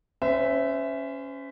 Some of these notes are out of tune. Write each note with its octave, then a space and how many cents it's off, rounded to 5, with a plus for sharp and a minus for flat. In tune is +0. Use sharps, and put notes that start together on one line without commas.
C#4 +0 C5 -40 E5 +0